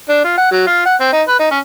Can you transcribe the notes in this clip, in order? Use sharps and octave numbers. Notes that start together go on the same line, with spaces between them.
D4
F4
F#5
F#3
F4
F#5
C4
D#4
B4
D#4
C#4